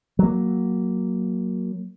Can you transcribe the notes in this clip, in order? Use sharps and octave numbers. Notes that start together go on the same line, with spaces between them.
F#3 A#3